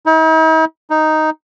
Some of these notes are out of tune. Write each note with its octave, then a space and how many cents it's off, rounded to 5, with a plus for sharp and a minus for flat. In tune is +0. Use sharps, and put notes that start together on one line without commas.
D#4 +45
D#4 +0